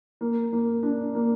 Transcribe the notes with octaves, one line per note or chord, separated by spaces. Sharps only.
A#3
A#3
D4
A#3